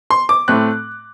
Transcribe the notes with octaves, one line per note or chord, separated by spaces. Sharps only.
C6
D6
A2 A3 C4 F#6